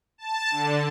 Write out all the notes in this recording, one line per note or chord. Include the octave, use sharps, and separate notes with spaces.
A5
D3